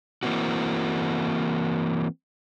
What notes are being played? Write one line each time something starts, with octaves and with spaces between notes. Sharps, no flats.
E3 A#3 C4 F#4